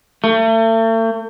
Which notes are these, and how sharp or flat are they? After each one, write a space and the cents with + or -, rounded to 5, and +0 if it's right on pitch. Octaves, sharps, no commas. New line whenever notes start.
A3 +40